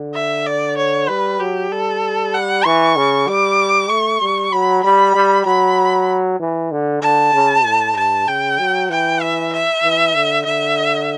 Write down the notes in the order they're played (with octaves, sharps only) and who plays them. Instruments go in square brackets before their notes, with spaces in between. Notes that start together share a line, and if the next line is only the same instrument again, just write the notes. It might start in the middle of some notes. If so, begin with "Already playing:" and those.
Already playing: [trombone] D3
[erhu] E5
D5
C#5
[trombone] G3 [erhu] B4
[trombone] F#3 [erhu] G4
[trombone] G3 [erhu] A4
[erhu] F#5
[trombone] E3 [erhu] C#6
[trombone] C#3
[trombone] G3 [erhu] D6
[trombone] A3 [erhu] C#6
[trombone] G3
[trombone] F#3 [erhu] B5
[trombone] G3 [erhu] B5
[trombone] G3
[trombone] F#3 [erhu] B5
[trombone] E3
D3
[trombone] D3 [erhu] A5
[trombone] C#3
A2
[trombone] G2 [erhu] A5
[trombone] C#3 [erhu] G5
[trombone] F#3
[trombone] E3 [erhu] G5
[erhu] E5
E5
[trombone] E3
D3
[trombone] D3 [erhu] E5